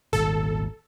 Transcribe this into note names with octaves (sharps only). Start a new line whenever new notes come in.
D#1 G#1 D#2 A4